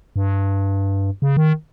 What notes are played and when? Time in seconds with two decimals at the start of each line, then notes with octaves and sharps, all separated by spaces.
0.16 G2
1.22 C#3
1.37 D#3